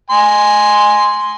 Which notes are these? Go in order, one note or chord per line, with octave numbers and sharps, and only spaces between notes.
G#5 C6